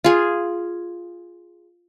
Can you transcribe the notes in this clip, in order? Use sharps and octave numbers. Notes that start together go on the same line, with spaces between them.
F4 G#4